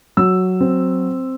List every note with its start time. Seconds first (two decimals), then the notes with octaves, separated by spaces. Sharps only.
0.17 F#3 E6
0.60 C4